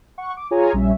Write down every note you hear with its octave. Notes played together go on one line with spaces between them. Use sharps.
F#5 C#6
D6
F4 G#4 C#5 G#5 A#5
A#1 G3 C#4 E5